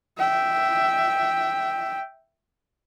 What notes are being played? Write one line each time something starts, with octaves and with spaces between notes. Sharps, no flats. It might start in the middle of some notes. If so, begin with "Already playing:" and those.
E5 G5